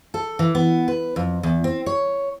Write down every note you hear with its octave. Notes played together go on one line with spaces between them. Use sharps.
A4
E3
B3
B4
F2
E2
C4
C#5